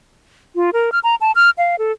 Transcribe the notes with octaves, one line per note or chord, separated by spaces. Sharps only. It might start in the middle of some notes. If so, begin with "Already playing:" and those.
F4
A#4
F6
A#5
A5
F6
F5
A4